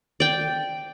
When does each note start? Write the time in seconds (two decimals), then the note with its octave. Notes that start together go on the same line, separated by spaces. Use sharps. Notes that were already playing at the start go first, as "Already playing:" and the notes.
0.20 D5 G5